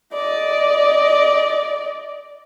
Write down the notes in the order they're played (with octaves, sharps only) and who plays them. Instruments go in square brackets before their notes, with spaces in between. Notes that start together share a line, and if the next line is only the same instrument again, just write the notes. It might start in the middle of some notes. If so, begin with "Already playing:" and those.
[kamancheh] D5 D#5